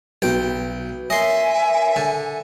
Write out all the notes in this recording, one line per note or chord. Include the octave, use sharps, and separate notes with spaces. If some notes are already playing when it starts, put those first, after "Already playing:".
B1 B3 F#4 B4 G5
A#4 C#5 D#5 E5 G#5 C6
D3